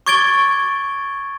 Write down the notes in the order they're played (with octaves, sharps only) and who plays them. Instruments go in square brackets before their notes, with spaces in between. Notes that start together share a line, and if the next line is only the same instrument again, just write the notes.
[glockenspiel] C#6 D6 G#6 A6 D7 G7